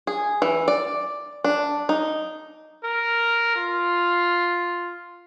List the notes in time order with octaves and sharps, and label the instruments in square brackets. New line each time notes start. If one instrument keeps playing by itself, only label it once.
[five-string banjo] G#4
E3
D5
D4
D#4
[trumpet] A#4
F4